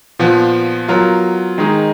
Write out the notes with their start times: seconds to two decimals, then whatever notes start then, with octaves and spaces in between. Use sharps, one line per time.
0.19 A#2 F3 B3
0.88 F#3 B3 F4 A#4
1.58 D#3 G#3 D#4 G#4